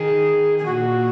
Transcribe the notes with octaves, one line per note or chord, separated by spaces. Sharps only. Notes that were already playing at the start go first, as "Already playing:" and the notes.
Already playing: D#3 G#4
G#4
A#2 F#4